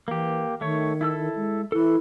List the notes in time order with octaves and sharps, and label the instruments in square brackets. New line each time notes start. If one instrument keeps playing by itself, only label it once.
[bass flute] E3 [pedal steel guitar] A#3 G4
[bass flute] D#3 [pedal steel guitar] A3 C#5
[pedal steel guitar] E4 A4 E6
[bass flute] G#3
[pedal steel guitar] E3 A4 [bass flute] E4